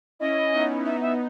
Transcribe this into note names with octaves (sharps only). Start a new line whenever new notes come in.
C#4 E4 D#5
B3 D#4
B3 D#4 E5
E5